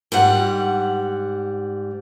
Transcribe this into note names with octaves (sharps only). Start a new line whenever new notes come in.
G#2 G3 F#5